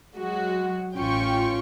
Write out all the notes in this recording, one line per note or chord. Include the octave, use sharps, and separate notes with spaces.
F#3 G#3 F#4
A1 C#4 F4 G5 C#6